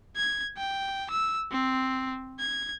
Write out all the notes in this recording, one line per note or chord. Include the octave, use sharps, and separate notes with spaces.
G#6
G5
E6
C4
G#6